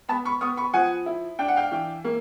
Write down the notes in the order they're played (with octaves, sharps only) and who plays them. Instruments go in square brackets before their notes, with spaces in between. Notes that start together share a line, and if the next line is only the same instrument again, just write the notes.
[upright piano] B3 A5 B5
B5 C#6
B3 C#6 D#6
B5 C#6
F3 F#5 G#5
E4
D4 G5
F#5
F5 G5
E3
A#3